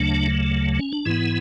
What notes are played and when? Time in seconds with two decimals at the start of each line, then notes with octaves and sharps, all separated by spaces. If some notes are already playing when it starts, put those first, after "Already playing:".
Already playing: D2 C#3 F#3 A3 D4
0.79 C#4
0.93 D4
1.06 G#2 E3 B3 E4